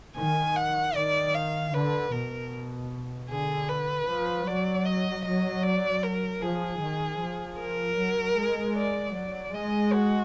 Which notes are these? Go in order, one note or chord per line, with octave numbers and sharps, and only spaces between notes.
D#3 G#5
F#5
D#3 D5
F5
D3 B4
B2 A#4
D3 G#4
B4
F3
F#3 D5
D#5
F#3 D#5
D5
A#4
F3 G#4
D#3
F3
A#4
F#3
G#3
D5
F#3 D5
G#3 D#5
F#4